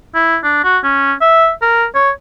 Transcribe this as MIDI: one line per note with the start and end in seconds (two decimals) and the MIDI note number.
0.15 0.38 64
0.44 0.60 62
0.64 0.78 66
0.83 1.13 61
1.21 1.51 76
1.62 1.85 70
1.95 2.11 73